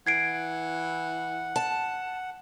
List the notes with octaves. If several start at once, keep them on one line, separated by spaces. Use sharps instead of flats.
E3 F#5 G#6 C7 D7
A5